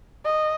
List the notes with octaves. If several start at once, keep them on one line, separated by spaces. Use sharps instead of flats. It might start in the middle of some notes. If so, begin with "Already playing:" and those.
D#5